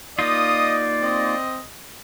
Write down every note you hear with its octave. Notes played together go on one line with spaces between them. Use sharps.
A#3 D#4 F4 D5 D#5 D#6
C4 D#5